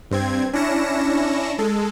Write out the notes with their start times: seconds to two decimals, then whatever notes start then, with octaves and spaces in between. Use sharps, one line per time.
0.11 G2 C4 G#6
0.53 C#4 D4 E4 A#6 C#7 E7
1.58 G#3 A4